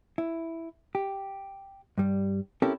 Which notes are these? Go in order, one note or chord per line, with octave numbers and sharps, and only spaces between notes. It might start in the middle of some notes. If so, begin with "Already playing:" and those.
E4
G4
G2 G3
C4 C#4 E4 G4 A4 A#4